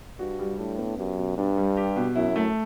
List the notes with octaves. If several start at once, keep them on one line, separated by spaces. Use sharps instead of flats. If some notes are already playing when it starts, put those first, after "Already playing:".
G2 F#4
G3
A2 D4
B3
F#2 G4
B2
G2 D4
G3
G4
B2
F#2 E4
A3